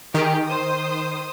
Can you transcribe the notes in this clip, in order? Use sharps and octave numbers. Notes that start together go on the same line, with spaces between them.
D#3 G4 G#4
C5 D#6